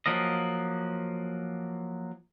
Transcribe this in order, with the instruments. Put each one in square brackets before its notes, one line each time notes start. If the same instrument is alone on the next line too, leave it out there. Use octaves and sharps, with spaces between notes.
[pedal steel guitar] F3 F#3 A#3 D#5